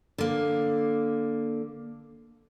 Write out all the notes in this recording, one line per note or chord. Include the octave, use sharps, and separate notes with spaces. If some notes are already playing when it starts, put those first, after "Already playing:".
D3 A#3